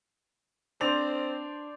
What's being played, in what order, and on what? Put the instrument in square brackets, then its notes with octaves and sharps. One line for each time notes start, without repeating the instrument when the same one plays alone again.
[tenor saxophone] C4 [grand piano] D4 F7 [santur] C5 D5